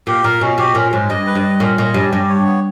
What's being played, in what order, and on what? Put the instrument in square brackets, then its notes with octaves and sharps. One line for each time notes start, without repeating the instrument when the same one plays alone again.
[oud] A#2 [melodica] G4
[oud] A#2 [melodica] A#4
[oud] B2 [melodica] C#4
[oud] B2 [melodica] G4
[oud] A#2 [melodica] C#4
[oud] G#2 [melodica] C#4
[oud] G2 [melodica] D#5
[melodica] B4
[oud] G2
[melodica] D#5
[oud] A#2 [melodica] C#4
[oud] A#2 [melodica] D#5
[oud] G2 [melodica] C#4
[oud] G2 [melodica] G4
[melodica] C#5
B3